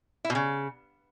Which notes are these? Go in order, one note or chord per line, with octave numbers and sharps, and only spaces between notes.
E4
B2
C#3